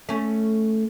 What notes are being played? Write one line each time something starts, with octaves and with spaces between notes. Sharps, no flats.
A3 C#4